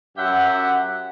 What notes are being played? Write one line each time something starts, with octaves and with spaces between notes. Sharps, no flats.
F#2 G4 E5 F#5